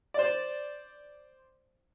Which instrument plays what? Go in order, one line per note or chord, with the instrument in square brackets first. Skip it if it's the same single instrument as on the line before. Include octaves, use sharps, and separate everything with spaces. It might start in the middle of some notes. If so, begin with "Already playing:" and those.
[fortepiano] C5 D5